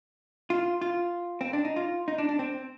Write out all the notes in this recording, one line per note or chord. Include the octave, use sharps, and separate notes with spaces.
F4
F4
C4
D4
D#4
F4
D#4
D4
D4
C4